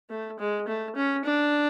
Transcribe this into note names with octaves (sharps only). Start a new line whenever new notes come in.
A3
G#3
A3
C#4
D4